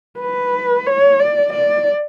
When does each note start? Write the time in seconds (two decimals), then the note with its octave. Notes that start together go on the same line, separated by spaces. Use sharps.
0.20 B4
0.87 C#5
1.20 D5
1.53 D5